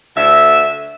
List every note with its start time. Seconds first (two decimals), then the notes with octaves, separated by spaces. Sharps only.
0.17 D2 D3 E5